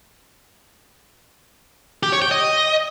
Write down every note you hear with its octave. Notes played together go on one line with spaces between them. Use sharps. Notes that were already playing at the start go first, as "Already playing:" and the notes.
G4
C#5
G5
D#5